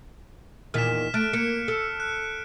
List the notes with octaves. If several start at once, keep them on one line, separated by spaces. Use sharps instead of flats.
E2 A#2 D#3 F6 B6 E7
A3 F6 F#6 D7
A#3 C#7
A4
F#6